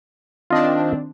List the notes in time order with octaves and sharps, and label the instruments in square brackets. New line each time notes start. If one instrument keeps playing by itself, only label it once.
[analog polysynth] D#3 C4 D4 [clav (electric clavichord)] F4 D#5